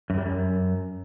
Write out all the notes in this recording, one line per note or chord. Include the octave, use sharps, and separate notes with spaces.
F#2
G3
F#2